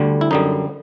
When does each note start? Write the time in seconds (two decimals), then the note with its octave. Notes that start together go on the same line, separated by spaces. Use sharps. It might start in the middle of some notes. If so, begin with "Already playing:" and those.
Already playing: D2 D3 G3
0.21 E4
0.31 F#2 D3 G3 D#4